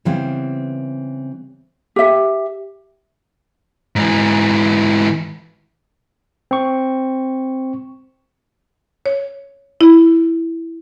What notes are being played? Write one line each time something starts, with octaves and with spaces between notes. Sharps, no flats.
C#3 E3 G3 B3 C4
G4 E5
G#2 E3
C4 C#6
C#5
E4